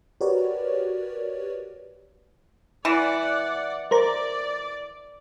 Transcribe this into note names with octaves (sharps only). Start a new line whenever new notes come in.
F#4 G4 A#4 B4 C#5 D5
E3 D5 F#5
A#4 C5 D5 A#5